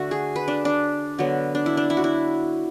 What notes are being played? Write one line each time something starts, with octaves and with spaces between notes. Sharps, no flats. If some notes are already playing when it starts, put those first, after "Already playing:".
Already playing: D3 A3 F#4
G#4
B4
D4
D4
D3 F#3 B3
D4
E4
D4
E4
F#4
E4